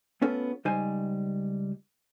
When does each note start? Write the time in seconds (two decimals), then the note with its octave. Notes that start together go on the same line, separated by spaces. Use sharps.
0.21 A3 B3 C#4 F4 A4
0.65 C#2 G3 D#4 C5 G#5